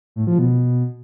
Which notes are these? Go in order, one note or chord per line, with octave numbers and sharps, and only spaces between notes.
A2
F3
B2